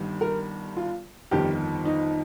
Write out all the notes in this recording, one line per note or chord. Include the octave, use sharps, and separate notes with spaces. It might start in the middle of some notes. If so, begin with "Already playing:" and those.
Already playing: G1 G2 D#3
A#4
F4
G1 F2 D#3 G4
D#4